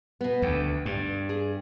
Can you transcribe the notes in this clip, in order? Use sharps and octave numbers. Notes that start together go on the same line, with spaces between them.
B2 B3
D2 G5
G2
G#4